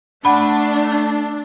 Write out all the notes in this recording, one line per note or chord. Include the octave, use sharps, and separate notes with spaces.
A3 D4 F#5 B5